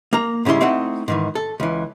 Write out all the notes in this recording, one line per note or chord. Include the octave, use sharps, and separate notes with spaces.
A#3 A#5
G#2 C#3 G3 E4 C6
A3 C4 D#4 E4 F#5
G#2 D#3 E3
A4
C#2 E3